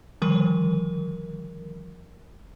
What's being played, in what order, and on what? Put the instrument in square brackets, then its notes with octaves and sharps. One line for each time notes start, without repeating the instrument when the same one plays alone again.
[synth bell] D3 D#3 F3 G3 A#4